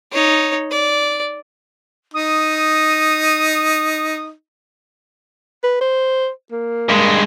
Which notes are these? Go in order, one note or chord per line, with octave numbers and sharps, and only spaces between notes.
D#4 C#5
D5
D#4 D#6
B4
C5
A#3
G2 G#3